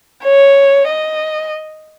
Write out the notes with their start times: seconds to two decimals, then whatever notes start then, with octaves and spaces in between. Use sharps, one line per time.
0.23 C#5
0.88 D#5